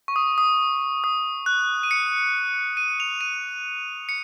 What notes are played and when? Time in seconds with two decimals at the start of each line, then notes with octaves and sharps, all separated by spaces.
0.08 C#6
0.16 D#6
0.38 D#6
1.04 D#6
1.46 F#6
1.83 D#7
1.91 C#7
2.77 D#7
3.00 F7
3.21 D#7
4.09 C#7